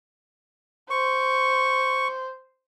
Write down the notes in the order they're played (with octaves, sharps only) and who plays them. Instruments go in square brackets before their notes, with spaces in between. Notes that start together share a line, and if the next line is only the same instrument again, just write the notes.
[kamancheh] C5 [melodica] C#6